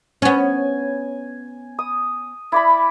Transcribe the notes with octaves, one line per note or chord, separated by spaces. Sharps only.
B3 C#4 G#5
D#6
E4 D5 B5